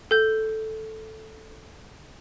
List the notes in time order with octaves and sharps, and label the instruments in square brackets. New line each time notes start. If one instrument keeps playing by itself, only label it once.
[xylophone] A4 G6